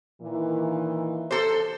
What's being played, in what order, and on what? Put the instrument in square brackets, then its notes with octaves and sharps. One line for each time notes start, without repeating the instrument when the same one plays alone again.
[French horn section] A#2 D#3 E3
[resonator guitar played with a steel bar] A4 C5